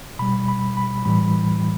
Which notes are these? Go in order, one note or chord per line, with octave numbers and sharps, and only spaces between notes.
B2 G3 B5
B5
B5
A2 E3 G3 B5